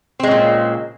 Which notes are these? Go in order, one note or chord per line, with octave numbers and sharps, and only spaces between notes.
A#2 C#3 G#3 C4